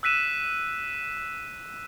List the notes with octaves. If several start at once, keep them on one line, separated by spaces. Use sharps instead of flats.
E6 F#6 B6 D#7 E7